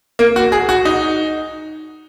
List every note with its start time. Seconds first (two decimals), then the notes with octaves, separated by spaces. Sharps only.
0.19 A#3
0.36 F#4
0.52 G#4
0.69 F#4
0.85 D#4